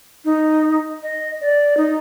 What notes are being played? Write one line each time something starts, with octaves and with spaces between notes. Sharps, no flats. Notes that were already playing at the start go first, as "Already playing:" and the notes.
D#4
D#5
D5
D#4